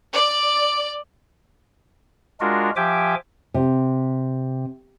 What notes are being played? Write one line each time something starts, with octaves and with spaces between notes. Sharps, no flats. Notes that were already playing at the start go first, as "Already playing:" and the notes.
D5
G#3 D4 F4 F#4 A#4
F3 G4 E5 G5 G#5 D6
C3